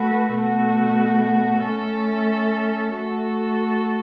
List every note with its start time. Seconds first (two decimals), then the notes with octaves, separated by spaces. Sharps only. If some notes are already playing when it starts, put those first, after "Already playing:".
Already playing: A3 F#4 B4
0.32 B2 A3 F#4
1.62 A3 C#4 A4 E5
2.94 A3 F#4 A4